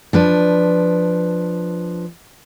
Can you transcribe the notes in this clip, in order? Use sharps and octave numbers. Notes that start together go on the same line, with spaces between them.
F3 D4 B4